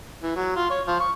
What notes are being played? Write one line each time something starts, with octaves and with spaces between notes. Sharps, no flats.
E3
F#3
F4
C#5
F3
C#6